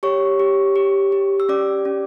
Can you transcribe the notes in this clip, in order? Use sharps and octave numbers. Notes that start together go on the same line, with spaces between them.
G4 C#5 C#6
G4
G4
G4
E6
C#4 D5 D6
C#4